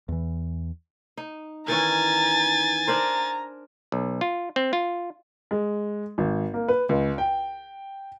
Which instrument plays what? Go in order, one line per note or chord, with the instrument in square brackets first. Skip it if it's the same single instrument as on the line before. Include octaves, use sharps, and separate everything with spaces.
[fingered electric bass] E2 E3
[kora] D#4
[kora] D#3 E3 C#4 [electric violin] G#5 A6 [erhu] A#5
[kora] D4 A#4 C5 [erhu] A#5
[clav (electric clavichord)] B1
F4
C4
F4
[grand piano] G#3
G#1
A#3
B4
C#2
G5